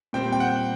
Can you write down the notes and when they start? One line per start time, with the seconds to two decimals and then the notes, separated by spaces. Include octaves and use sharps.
0.13 A#2 G3 C4 G5
0.32 G5
0.40 F#5